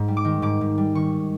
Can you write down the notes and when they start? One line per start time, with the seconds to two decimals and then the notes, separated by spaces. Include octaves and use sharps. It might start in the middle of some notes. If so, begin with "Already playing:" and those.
Already playing: G#2
0.08 G3
0.17 D6
0.25 D#3
0.42 G#2 D6
0.61 G#2
0.78 G3
0.95 D#3 C#6